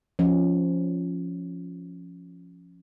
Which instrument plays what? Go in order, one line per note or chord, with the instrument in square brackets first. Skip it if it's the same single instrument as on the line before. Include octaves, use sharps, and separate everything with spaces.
[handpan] F3 C#4